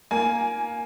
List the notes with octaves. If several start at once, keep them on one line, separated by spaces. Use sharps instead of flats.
A#3 G#5